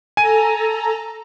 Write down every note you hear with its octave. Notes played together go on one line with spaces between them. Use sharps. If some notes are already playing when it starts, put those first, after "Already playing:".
A4 G#5 A#5 D#7